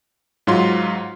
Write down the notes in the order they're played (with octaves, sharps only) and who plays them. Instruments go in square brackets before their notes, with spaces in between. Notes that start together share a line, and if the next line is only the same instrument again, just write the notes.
[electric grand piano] G#2 F#3 F4 C6